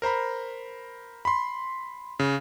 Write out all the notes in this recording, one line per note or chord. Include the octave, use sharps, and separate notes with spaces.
A#4 C5 A#5 B5
B5 C6
C#3